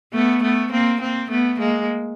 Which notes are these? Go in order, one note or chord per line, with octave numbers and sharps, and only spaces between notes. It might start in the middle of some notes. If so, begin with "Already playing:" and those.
A3 B3
A3 B3
A#3 C4
A#3 C4
A3 B3
G#3 A#3